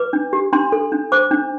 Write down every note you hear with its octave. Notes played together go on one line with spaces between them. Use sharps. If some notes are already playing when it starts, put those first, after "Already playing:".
Already playing: B4 D6
D4
G4
D4 C6
A4
D4
C5 D6
D4